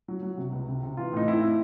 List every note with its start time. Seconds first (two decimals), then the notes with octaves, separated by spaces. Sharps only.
0.08 F#3
0.23 F#3
0.37 C3
0.53 C#2
0.68 C3
0.83 C3
0.97 E3 F4
1.13 A2 D#4
1.28 C4 E4
1.43 C4